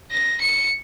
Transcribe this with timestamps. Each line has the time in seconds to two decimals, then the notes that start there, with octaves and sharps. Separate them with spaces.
0.11 A#6
0.41 C#7